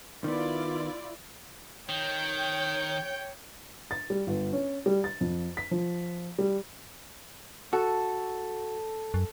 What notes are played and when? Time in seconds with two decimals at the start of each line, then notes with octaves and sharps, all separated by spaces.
0.24 D#3 B3 E4 F4 D5
1.89 D#3 C#5 G5 G6
3.91 A6
4.10 G3
4.27 G1
4.53 C#4
4.86 G3
5.04 A6
5.21 F2
5.57 B6
5.71 F3
6.39 G3
7.73 F#4 A4
9.14 F#2